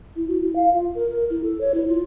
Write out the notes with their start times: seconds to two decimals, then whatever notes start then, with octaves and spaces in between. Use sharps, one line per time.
0.16 E4
0.28 F#4
0.42 E4
0.56 F5
0.74 F4
0.95 A#4
1.10 A#4
1.30 E4
1.43 A4
1.61 C#5
1.74 E4
1.88 F4